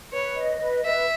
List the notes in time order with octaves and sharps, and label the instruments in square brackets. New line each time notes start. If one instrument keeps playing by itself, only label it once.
[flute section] B4 [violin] C#5
[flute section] D#5
B4
[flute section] B4 [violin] E5